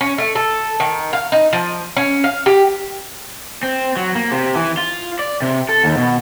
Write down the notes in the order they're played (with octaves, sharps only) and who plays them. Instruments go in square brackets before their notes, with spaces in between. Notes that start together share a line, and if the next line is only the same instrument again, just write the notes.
[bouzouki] C#4
A3
A4
D#3
F5
D#4
F3
C#4
F5
G4
[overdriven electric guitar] C4
F#3
A#3
C3
E3
F4
D5
C3
A4
D#2
B2